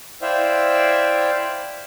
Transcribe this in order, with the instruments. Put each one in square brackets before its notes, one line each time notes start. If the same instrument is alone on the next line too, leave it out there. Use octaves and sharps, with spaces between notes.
[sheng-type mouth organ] E4 C5 D5 E5 F5 G5